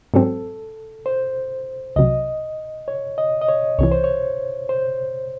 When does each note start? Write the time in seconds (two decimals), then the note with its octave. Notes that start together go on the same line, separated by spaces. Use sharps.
0.14 G#2 F#3 C4 A4
1.06 C5
1.96 C2 C3 F#3 D#5
2.88 C#5
3.18 D#5
3.41 D#5
3.49 C#5
3.78 C2 C3 E3 C#5
3.92 C5
4.04 C#5
4.69 C5